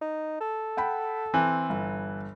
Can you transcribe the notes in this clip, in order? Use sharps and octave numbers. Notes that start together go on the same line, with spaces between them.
D#4
A4
F#5 G5 B5
E3 C4
G1